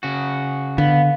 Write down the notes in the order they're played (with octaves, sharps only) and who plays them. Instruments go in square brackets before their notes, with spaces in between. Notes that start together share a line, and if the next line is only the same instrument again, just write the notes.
[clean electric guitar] C#3 F#4
[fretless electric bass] D3 [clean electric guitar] B3 [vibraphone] F5